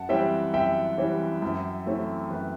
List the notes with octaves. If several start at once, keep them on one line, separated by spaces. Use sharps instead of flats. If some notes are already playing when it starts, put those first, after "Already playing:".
Already playing: F#2 F#5 A5
E3 G3 C4 E5 G5
F#2 E5 G5
E3 G3 C4
F#2
E3 A3 C4
F#2 B4